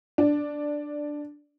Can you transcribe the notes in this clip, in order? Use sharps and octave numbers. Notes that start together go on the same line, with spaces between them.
D4